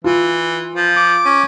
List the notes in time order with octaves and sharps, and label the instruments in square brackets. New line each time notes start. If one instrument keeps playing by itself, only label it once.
[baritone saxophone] E3 [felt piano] F4
[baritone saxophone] F3
[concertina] D6
[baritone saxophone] C#4